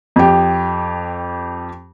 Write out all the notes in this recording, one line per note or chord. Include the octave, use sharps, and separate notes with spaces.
F2 G4